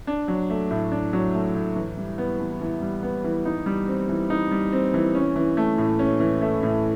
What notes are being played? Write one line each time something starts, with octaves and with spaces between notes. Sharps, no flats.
D4
F#3
A3
A2
D4
F#3
A3
A2
E3
G3
B3
E3
E3
G3
B3
E3
D#4
G3
C4
E3
D#4
G3
C4
E3
C#4
E3
A3
A2
C#4
E3
A3
A2